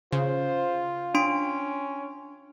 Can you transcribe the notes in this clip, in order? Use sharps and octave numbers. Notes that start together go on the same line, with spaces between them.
C#3 F4 C5
C#4 D4 C6 D7